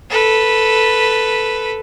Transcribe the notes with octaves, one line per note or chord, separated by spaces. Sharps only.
A4 B4